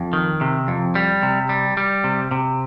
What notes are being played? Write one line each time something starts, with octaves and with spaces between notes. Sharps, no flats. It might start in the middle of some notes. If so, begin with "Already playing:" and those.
Already playing: F2
D#3
C3
F2
G3
C3
G3
G3
C3
C3